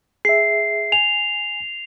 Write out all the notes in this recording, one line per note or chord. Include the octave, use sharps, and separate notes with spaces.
G#4 E5 C7
G#5 F7